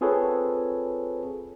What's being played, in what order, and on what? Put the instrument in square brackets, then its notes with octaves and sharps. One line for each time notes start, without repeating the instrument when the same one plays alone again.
[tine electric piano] C4 F4 G#4 A4 B4 C#5